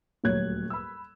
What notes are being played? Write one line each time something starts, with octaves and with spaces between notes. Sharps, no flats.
D#1 D2 F#3 C#5 F#6 G#6
B5 E6